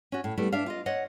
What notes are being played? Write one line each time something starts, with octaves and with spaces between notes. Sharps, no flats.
C#4 F#4
A2
G3 A3 B3 E4
D4 E5 F5
F4 D#5
C#5 D#5 F#5